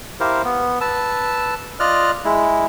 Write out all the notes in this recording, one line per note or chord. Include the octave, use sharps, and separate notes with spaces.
E4 G4 A#4 C5 F5
B3
B4 A5 E6
F4 D5 D#5 F6 F#6
G#3 E4